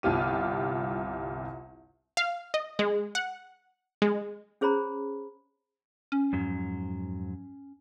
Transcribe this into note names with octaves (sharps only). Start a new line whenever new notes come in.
G1 C2 F4 G4 D#7
F5
D#5
G#3
F#5
G#3
C#4 G#4 C5 C#5 A#5 B5
C#4
F2 G#2 F#3